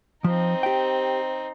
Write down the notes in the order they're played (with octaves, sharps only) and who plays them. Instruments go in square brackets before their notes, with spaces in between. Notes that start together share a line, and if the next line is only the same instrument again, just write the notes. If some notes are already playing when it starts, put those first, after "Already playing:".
[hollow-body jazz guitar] F3 [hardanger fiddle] C4 D#4
[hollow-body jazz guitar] G4 G5